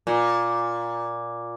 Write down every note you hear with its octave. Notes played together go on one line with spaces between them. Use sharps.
A#2